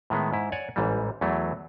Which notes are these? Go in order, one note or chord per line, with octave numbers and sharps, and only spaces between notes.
A2 D#3 G#3 B3
G#2 E4
C#5 D5 F#5 G#5
A1 G#2 E3 G3
E2 E3 F#3 A3